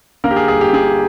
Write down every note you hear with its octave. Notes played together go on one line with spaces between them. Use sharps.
D3 A#3 A#4
G4
G#4
G1 G#4
G4
D3 G#4